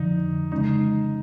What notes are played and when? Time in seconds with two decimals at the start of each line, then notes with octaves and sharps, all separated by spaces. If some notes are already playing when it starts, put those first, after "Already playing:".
Already playing: F2 D3 F3 D#4
0.52 C#3 E3 G#3 C#4 D#4